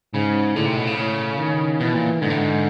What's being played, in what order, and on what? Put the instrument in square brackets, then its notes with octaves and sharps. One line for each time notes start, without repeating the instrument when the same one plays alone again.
[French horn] G#2 [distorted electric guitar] C#3
[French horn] A2 [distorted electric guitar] D3
[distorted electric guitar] C3
B2
C#3
[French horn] A2
D#3
[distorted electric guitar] B2 [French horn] E3
[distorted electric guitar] A#2
[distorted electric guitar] G#2 [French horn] D3
[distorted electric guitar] A2
G#2